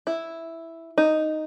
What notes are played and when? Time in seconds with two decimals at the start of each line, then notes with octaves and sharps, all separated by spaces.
0.07 E4
0.98 D#4